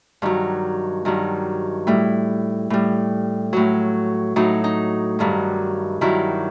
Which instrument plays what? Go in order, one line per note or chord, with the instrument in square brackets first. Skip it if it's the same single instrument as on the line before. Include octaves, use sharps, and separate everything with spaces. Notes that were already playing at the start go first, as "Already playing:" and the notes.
[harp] G2 D#3 F#3
G2 D#3 F#3
A2 G3 E4
A2 G3
A2 F#3
A2 F#3 D#4
D#4
G2 D#3 F#3
G2 D#3 F#3 E4